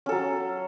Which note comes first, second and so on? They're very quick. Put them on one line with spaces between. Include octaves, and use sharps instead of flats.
C#4 A4 F#3